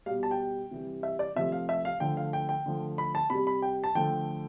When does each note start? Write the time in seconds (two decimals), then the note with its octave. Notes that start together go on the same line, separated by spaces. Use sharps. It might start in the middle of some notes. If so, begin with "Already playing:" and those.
0.06 B2 G3 F5
0.23 A5
0.31 G5
0.71 C3 E3 G3
1.03 E5
1.19 D5
1.36 C3 F3 A3 E5
1.52 F5
1.69 E5
1.85 F5
2.00 D3 F3 A3 G5
2.17 F5
2.33 G5
2.49 G5
2.66 D3 F3 A3
2.98 B5
3.15 A5
3.30 C3 G3 B5
3.47 B5
3.62 G5
3.84 A5
3.95 D3 F3 A3 G5